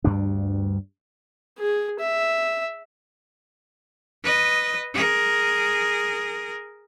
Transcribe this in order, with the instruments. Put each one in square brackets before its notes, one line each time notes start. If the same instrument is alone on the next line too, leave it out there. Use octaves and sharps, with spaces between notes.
[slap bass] D2 G2 G3 D4
[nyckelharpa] G#4
E5
[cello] B4 D#5
G#4 A#4